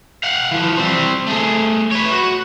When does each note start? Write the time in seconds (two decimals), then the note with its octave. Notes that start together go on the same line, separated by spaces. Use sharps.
0.23 F5 F#5
0.51 E3 F3
0.78 G3 C4
1.27 A3 G#4
1.91 B4 C#5
2.12 F#4